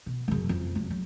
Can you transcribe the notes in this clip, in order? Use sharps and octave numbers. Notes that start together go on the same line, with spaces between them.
B2
F#2 C#3
F2 C#3
F#1
F#3